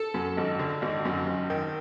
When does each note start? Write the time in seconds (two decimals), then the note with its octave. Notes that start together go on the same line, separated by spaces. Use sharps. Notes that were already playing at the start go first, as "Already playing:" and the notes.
Already playing: A4
0.14 F#2
0.37 G#1
0.59 D3
0.82 G#1
1.05 F#2
1.27 G#1
1.50 D#3